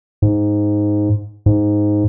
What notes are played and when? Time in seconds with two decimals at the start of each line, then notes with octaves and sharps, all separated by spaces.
0.22 G#2
1.46 G#2